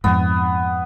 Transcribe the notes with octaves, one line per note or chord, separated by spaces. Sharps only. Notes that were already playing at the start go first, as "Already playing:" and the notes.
F2 G#2 B3